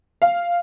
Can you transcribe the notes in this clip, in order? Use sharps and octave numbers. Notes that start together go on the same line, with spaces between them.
F5